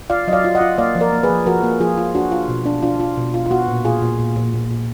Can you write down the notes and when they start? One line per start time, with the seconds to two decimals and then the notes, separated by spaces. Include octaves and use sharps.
0.10 F4 D5 F5
0.27 F#3 D#5
0.33 D5 F5
0.44 F4
0.55 D#5 F#5
0.61 F4
0.78 A#3 D5 F5
0.95 F3
1.00 A#4 D5
1.13 A#3
1.23 G#4 B4
1.30 F3
1.46 F3 F#4 A#4
1.63 A#3
1.80 F3 F4 G#4
1.98 F4
2.15 D4 F#4
2.32 F4
2.49 B2
2.66 D4
2.82 D4 F4
3.00 F4
3.17 B2
3.34 F4
3.46 F4
3.51 B3 F#4
3.68 A#2
3.85 A#2 F4 G#4
4.02 A#2
4.19 A#2
4.36 A#2
4.53 A#2
4.71 A#2